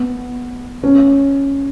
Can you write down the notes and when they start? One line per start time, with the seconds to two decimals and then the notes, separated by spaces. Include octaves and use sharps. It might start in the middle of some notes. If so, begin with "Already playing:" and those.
Already playing: B3
0.83 C#4